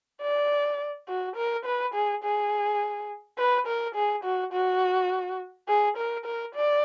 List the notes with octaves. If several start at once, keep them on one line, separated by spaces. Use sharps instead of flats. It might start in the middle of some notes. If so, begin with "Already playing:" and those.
D5
F#4
A#4
B4
G#4
G#4
B4
A#4
G#4
F#4
F#4
G#4
A#4
A#4
D5